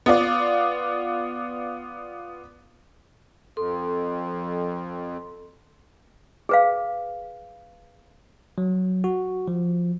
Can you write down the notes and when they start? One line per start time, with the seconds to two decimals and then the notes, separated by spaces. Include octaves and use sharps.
0.06 B3 F4 D5
3.57 F2 A4 C6
6.49 G#4 B4 F5
8.58 F#3
9.04 F#4
9.48 F3